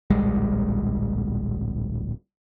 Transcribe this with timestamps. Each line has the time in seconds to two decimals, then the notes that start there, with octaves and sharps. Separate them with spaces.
0.10 D1 A#1 G3 G#3